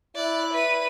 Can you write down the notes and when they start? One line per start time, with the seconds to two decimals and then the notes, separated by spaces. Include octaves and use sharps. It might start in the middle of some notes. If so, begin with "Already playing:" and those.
0.16 E4 D5 F#6
0.53 B4 D#7